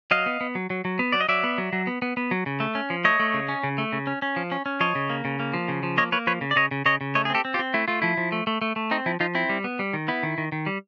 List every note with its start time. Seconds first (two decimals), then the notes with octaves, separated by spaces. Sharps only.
0.11 F#3 D#5 F5
0.26 B3
0.41 B3
0.55 F#3
0.70 F#3
0.85 F#3
0.99 B3
1.12 F#3 D5
1.21 D#5
1.29 F#3 D5 E5
1.44 B3
1.58 F#3
1.73 F#3
1.87 B3
2.02 B3
2.17 B3
2.31 F#3
2.46 C#3
2.60 A3
2.75 C#4
2.90 F3
3.04 A3 C#5 D#5
3.20 A3
3.34 C#3
3.49 C#4
3.64 C#3
3.78 A3
3.93 C#3
4.07 C#4
4.22 C#4
4.36 F3
4.52 C#4
4.66 C#4
4.80 F3 C#5 D#5
4.95 C#3
5.10 A#3
5.25 C#3
5.40 A#3
5.54 F3
5.68 C#3
5.83 F3
5.97 A#3 C#5 D#5
6.12 A#3 B4 C#5
6.27 F3 B4 C#5
6.41 C#3
6.51 D5
6.56 C#3 C#5 D#5
6.71 C#3
6.85 C#3 C#5 D#5
7.01 C#3
7.15 A3 C#5 D#5
7.25 G#4
7.30 C4 G4 A4
7.45 C4
7.54 F4 G4
7.59 C4
7.74 A3 E4
7.88 A3 F4
8.02 F3 E4
8.17 F3
8.32 A3
8.47 A3
8.62 A3
8.76 A3
8.91 C4 D#4
9.06 F3 E4
9.20 F3 D#4 F4
9.35 C4 E4
9.49 G3
9.64 B3
9.79 G3
9.93 D#3
10.08 B3 E4
10.23 D#3
10.38 D#3
10.52 D#3
10.66 G3